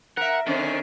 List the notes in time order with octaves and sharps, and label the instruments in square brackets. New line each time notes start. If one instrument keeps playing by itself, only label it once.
[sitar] A#4 E5 [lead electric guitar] F#5
[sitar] D3 C4 C#4 [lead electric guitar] D#3